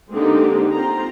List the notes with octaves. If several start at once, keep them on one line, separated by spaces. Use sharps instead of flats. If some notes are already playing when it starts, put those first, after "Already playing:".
D3 G#3 A#3 C4 D#4 G4
C4 F4 C5 A#5